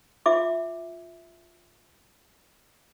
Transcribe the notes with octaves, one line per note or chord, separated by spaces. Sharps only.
F4 E5 D6